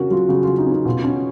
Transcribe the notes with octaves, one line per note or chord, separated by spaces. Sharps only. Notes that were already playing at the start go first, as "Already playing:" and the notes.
Already playing: C#3 C#4 F#4 A#4
F#3 F4
C#3 F#4
C#3 F4
D#4
C#4
D#4
B2 F4
C#4